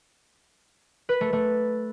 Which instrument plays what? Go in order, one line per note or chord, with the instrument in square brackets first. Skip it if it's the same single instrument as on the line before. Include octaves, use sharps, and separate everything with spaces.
[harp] B4
A3
A3